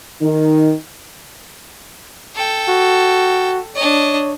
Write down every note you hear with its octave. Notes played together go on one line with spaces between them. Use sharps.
D#3
A4 G5
F#4
D4 C#5 D#5